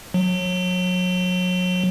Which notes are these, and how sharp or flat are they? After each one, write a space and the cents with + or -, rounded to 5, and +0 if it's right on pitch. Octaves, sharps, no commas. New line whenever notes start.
F#3 -30